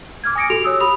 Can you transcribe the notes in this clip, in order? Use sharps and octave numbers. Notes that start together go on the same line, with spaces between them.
D6 F6 G#6
G#5 D#6 A#6 C#7 D7
F#4 G4 A4 F7
C#5 D#6 E6
G4 B5 D#6 F7